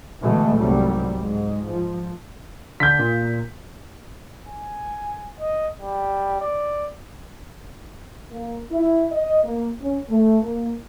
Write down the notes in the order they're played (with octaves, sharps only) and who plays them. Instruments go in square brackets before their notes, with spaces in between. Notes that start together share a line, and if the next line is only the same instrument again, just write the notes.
[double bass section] B2 D3 E3 G#3 A3
C2 G#2 F#3 G3
G#2 G#3
F3
[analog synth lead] D3 [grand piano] G6 B6
[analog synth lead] A#2
[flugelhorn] G#5
D#5
G3
D5
[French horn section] A#3
E4
D#5
A#3
C#4
A3
A#3